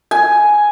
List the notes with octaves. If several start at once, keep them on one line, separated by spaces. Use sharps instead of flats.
G#5